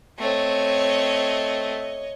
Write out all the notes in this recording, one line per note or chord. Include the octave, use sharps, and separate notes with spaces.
A3 C4 C#5 D#5